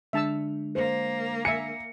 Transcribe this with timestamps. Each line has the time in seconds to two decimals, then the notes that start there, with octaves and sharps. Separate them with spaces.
0.13 D3 G#3 D4 E5 A5 E6
0.75 A#3 C5
1.45 E5 G#5 C#7